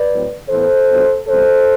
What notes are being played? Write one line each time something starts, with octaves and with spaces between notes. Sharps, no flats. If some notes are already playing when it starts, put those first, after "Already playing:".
Already playing: B4 D5
A2 F#3 C4
A2 E3 B3 A4 C5
C3 F#3 B3 D4
E2 C3 G3 A4 C5